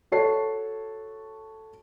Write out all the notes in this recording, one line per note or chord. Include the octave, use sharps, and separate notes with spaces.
F#4 A4 C#5 A5 C7